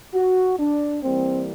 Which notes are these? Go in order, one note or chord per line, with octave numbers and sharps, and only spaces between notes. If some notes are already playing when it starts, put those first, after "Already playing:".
F#4
D4
E3 G3 A#3 C4